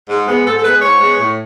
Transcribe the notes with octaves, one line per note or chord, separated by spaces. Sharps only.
G#2
G#3 B3
G#2 A4
A4
G#3 B3 B4
G#2 C#5
G#3 B3
A2